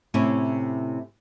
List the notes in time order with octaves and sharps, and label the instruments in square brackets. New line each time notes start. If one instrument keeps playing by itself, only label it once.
[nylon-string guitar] A2 C3 C#4 E4